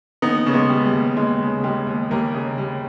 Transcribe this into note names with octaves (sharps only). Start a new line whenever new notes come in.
D#2 B3 D#4
C#3 C#4
G#3 B3
G3
G3
D#2
D#2 G#3
C#3
G3 G#3
D#2
D#2 G3 A#3
C#3
G3